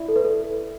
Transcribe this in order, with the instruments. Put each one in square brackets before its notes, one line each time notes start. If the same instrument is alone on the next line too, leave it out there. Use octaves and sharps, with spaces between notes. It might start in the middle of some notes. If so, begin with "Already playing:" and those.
Already playing: [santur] E4 D5
[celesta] A4
B4
A4